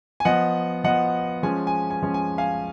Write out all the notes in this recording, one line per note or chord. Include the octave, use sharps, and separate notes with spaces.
G#5
F3 B3 D#5 F#5
F3 B3 D#5 F#5
F3 G#3 C#4 G#5
G#5
G#5
F3 G#3 C#4
G#5
F5 G#5